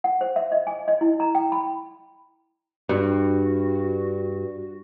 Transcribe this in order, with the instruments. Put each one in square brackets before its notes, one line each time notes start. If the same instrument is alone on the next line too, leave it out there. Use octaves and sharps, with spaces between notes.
[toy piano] F#5
C5
E5
D#5
G#5
D#5
E4
A#5
G5
B5
[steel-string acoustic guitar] G2 [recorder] F#4